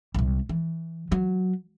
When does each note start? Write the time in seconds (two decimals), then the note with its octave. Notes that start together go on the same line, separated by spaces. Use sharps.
0.14 C2 C3
0.49 E3
1.12 F#3